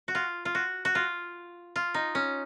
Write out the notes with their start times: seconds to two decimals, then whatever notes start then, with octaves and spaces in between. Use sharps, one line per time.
0.08 F#4
0.15 F4
0.45 F4
0.55 F#4
0.85 F#4
0.95 F4
1.76 F4
1.94 D#4
2.15 C#4